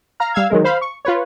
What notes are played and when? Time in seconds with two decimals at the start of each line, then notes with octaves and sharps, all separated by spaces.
0.20 F5 A#5 F6
0.34 G3 F5 E6 G#6
0.50 D#3 F#3 G#3 A#4
0.64 C5 F5 B5
0.81 C#6
1.05 F4 B4 C#5